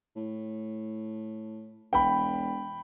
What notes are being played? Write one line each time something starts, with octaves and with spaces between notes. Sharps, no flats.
A2
E1 G5 B5